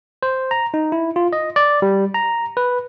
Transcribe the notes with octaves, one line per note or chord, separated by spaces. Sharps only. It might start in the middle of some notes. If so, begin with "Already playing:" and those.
C5
A#5
D#4
E4
F4
D#5
D5
G3
A#5
B4